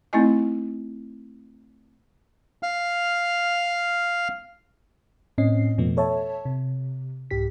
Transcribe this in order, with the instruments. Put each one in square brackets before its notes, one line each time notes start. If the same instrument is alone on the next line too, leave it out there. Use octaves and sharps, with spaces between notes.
[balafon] A3 C4 D#4 E4 D#5 G#5
[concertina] F5 F6
[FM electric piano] A2 C4 C#4 D#5 C7
F2 B2 F3 A3 B3
A4 C#5 E5 A5
C3
C2 G#2 G4 B6